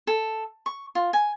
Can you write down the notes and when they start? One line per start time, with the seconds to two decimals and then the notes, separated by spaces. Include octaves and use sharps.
0.07 A4
0.66 C#6
0.95 F4
1.13 G#5